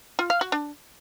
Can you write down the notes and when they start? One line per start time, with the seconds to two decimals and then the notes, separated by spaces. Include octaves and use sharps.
0.19 F4
0.30 F5
0.41 F#4
0.52 D4